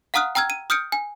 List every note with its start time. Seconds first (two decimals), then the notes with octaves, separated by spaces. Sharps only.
0.14 F5 F#5 A#5 D#6 F6 F#6
0.35 G5 A#5 E6 F6 G#6
0.50 D#7
0.70 D#6 F6 G6 C#7 D7
0.92 G#5